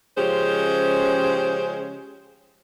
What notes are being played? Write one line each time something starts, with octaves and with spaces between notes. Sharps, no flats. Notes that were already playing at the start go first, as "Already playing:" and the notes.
C#3 F3 G#3 C#4 G4 C5